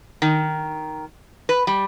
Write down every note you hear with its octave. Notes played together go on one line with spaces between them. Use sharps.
D#3
B4
G3